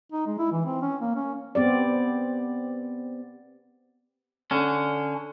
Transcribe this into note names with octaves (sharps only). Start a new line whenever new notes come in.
D#4
G#3
E4
E3
C4
C#4
A#3
C#4
B3 C4 G4 D5
D3 C#4